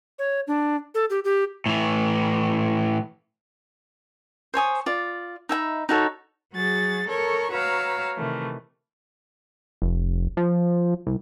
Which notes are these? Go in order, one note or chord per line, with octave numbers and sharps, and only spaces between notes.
C#5
D4
A4
G4
G4
A2 E3
C5 C#5 G#5 D#6
F4 D5
D#4 E5 G5 B5
D#4 F#4 A4 C#5
F#3 F#4 G#4 A6
A4 A#4 C#5 C#6
F#4 B4 C#5 F5 A#5 E6
C3 D#3 E3 A3
F1
F3
C2